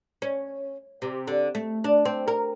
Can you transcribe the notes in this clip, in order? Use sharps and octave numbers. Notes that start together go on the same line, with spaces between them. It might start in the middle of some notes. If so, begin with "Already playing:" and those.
C#4
C3
D3
A3
D4
C4
A#4